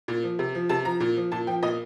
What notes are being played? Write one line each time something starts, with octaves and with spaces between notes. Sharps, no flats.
A#2
F3
C3
F3
C3 A5
F3 A#5
A#2
F3
A#2 A5
F3 G5
A#2 D#5